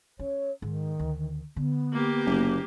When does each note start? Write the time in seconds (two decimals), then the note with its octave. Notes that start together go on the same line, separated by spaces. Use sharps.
0.19 C#4 C#5
0.62 G#2 D#3
0.99 D2
1.56 D3 B3
1.93 A#3 G4
2.26 F#1